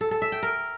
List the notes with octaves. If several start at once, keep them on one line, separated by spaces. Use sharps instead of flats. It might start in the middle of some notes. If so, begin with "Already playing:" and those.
A4
A4
E5
G5
A#4